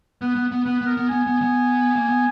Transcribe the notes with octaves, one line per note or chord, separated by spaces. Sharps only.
B3 B4
B3
B3
B3 B4
B3
A#4
B3
B3 G#5
B3
B3
A#3
B3